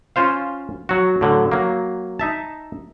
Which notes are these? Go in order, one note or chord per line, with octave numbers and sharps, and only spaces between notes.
C#4 F4 C5 F5
F#3 F#4
A2 D3 F#3
F#3 A#3
D#4 E5 A5